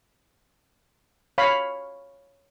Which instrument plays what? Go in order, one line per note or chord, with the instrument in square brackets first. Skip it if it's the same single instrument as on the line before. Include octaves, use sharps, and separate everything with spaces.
[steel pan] C#5 F5 B5